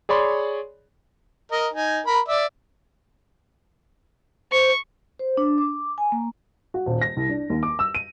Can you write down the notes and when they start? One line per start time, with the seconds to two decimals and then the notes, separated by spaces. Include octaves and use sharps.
0.09 G#4 C#5 D5 B5 C6
1.52 A#4 D#5
1.73 D#4 G#5
2.07 A#4 B5
2.28 D5 E5
4.52 C5 C#6
5.19 C5
5.37 D4
5.58 D6
5.98 G#5
6.12 A#3
6.74 F#4
6.86 D#1
7.02 A#6
7.17 C2
7.29 D4
7.50 D#2
7.63 D6
7.79 E6
7.95 D#7